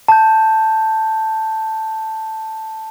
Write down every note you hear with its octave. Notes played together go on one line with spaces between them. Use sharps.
A5 G6